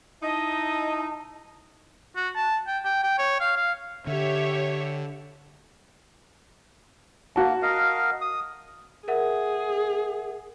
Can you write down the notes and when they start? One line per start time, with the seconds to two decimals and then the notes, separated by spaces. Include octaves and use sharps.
0.22 D#4 E4 D#5 A5
2.16 F#4
2.36 A5
2.67 G5
2.85 G5
3.04 G5
3.18 C#5
3.40 F5
3.56 F5
4.07 D3 G4 C#5 E5
7.36 A#3 F#4 A5
7.62 A#4 D#5 F5
8.21 D#6
9.08 G#4 A#4 E5 F#5